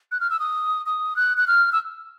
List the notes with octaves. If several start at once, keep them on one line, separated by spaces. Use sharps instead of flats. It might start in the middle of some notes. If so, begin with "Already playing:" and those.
F#6
F6
E6
D#6
D#6
F#6
F#6
F6
E6